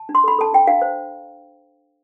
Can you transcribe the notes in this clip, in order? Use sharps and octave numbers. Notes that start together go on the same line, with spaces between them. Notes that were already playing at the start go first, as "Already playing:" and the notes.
Already playing: A5
D4
C6
A4 B5
A4 A5
D4 G5
D4 F5
C5